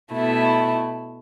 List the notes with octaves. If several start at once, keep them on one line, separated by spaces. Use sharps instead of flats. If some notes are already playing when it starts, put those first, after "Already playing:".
B2 A3 E4